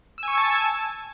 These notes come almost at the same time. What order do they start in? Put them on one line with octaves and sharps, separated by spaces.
E6 G#5 C#6 G#6 A5